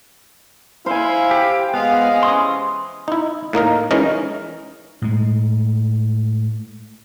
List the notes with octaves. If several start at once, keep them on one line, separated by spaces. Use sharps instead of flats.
E4 C5 F5 G#5
G4
G#3 B3 F5
C3 E3 C#4 C6 D#6
D#4 E4
A2 A#3 D#4 A#4
E3 G#3 C#4 D#4 A#4
A2 G#3